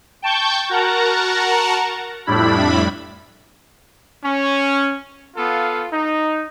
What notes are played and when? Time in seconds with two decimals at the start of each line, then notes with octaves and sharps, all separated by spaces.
0.22 G5 A5 C#6 G6
0.69 F#4 A#4 F#5 A5 A#5
2.26 F2 A2 G3 D4 E4 B5
4.24 C#4
5.36 B3 F4 A4 F5
5.92 D#4